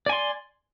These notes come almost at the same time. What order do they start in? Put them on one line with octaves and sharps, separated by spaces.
D5 G#5 C6